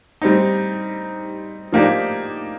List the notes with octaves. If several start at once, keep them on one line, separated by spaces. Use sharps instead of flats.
G3 C4 D#4
F3 A#3 D#4 G4 D5